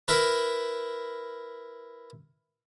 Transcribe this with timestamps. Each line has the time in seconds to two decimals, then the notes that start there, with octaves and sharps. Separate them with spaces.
0.08 E4 A#4 B4